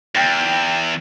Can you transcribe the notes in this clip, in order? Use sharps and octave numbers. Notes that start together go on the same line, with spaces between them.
E2 G5